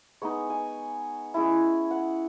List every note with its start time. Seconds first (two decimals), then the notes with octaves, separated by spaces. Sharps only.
0.22 G#3 B3 D#4 C#5
0.50 G#5
1.34 G#3 C#4 E4
1.91 F#5